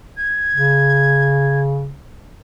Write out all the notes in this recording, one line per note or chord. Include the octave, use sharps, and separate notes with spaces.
G#6
C#3